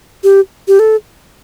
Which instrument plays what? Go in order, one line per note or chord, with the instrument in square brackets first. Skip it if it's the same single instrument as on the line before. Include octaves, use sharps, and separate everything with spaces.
[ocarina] G4
G4
A4